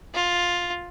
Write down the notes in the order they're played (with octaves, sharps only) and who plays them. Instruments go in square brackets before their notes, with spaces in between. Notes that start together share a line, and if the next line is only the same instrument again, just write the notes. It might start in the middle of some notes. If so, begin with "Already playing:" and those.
[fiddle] F4